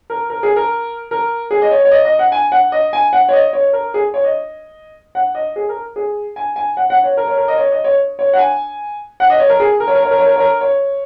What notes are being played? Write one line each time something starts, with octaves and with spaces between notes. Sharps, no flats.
A#4
A#4
G#4
A#4
A#4
G#4
D#5
C#5
C#5
D#5
D#5
F#5
G#5
F#5
D#5
G#5
F#5
C#5
D#5
C#5
A#4
G#4
C#5
D#5
F#5
D#5
G#4
A#4
G#4
G#5
G#5
F#5
F#5
C#5
A#4
C#5
A#4
D#5
C#5
D#5
C#5
C#5
F#5
G#5
F#5
D#5
C#5
A#4
G#4
A#4
C#5
A#4
C#5
A#4
C#5
A#4
C#5
A#4
C#5